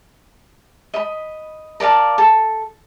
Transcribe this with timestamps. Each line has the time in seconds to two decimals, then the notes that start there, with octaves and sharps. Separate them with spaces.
0.94 D#5 B5
1.80 A#4 D5 F5 A5
2.18 A4